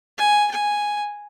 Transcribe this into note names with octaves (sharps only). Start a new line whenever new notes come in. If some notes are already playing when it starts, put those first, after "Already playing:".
G#5
G#5